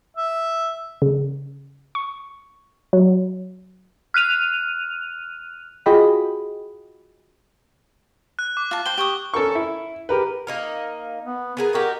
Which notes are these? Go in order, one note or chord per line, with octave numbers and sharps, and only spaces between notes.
E5
C#3
C#6
F#3
F6 F#6 D#7 F7
F4 F#4 G#4 D#5 G5 B5
F#6
D6
F4 A5
C5 G5 G7
G4 C#6 D#6
C#4 A4 A#4 C#6
E4
G4 A#4 B4
A#3 D#4 A#4
B3
B3 G#4 A#4
D#4 F#4 G4 A#4